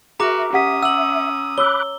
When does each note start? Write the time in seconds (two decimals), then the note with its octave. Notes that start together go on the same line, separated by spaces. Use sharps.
0.20 F#4 G#4 A#4 E5 A#5 D6
0.53 C#4 G4 F#5 D#6 B6
0.83 F#5 E6 F#7
1.58 C#5 B5 D6 E6 F#6 G7